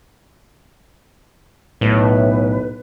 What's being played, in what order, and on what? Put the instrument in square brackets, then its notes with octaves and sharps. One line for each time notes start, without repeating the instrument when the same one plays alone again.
[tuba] B1 [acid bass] A2 [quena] B4